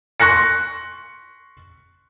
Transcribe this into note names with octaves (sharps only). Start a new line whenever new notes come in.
C6 C#6 F#6 A#6 C#7